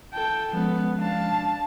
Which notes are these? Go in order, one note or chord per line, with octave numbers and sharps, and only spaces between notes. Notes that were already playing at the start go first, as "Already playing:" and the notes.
A4 G5
F3 G#3 B3 C#4
D4 F5 A5